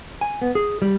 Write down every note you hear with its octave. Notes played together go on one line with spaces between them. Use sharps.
G#5
B3
G#4
G3